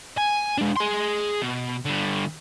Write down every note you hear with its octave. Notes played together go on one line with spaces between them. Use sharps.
G#5
G#3 D4
G#4 C6
B2
D3 G3